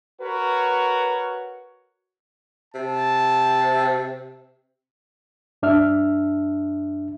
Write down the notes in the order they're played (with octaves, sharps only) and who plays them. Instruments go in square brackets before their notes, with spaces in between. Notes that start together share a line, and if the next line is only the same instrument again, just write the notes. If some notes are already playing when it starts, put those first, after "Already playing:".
[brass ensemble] F#4 A#4 B4 C#5
[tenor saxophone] C3 [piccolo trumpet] A5
[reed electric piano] G2 D4 E5 F6